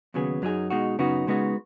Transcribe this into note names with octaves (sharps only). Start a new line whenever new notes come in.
D#2 C#3 F#3 B3 G#4
F#2 F#3 D#4 G#4
B2 G#3 D#4 F#4
F#2 C#3 B3 D#4 F#4
C#3 G#3 B3 D#4 F#4